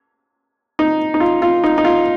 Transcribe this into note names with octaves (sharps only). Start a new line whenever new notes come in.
D#4
D#4
F4
F4
D#4
D#4
F4